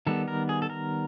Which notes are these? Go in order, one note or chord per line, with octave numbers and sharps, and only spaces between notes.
D#3 G3 B3 A4
A#4
G#4
A4
A#4